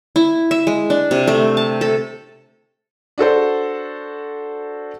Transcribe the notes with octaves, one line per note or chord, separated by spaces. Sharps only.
E4
E5
G#3
D4
C3
A3
A5
A4
D4 F#4 A4 C5